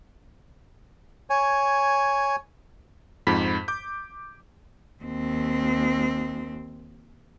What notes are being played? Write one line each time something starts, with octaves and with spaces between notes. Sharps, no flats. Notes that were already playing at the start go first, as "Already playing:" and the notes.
C#5 G#5
F2 G#2 B5 B6
D6 G6
D#2 C4